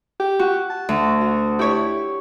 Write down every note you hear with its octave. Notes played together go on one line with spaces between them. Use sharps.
G4
F#4
A5
D2
F#4
E4 G4 C#5